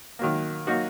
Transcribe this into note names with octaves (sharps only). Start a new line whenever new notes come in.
D#3 F#3 A#3
F#3 A#3 D#4 F#4